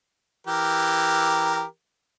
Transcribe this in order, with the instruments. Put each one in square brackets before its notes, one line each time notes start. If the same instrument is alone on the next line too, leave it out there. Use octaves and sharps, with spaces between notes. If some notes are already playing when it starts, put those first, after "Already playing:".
[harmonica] E3 G4 A#4